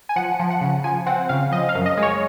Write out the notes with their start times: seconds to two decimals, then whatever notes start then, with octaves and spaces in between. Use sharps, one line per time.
0.09 G#5
0.16 F3 F#5
0.39 F3
0.50 F#5
0.61 C#3
0.84 F3 G#5
1.06 C4 F#5
1.29 C#3 F5
1.52 F3 D#5
1.69 F5
1.75 F#2
1.86 D#5
1.97 G#3
2.03 C#5